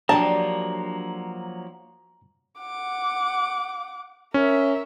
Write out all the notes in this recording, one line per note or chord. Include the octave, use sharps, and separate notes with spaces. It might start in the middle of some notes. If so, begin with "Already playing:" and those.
F3 F#3 A#3 D4 G4 A5 A#5
F#5 D6
C#4 A#4 E5